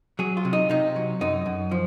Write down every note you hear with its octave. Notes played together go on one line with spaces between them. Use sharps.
F#3 G#4
F4
C3
D#4
C3 D#4
F#3
F#2 D#4
F#2
F3